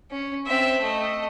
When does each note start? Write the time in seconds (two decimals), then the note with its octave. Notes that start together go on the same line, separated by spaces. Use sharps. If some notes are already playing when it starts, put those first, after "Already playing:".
0.11 C#4
0.46 C4 E5
0.81 A3 D#5